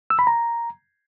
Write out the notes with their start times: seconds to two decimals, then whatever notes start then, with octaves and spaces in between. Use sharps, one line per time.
0.10 E6
0.19 B5
0.27 A#5